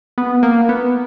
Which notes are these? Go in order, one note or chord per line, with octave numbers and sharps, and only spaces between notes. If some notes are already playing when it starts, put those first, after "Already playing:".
B3
A#3
B3